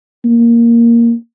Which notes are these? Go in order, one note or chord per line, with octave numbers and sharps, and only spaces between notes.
A#3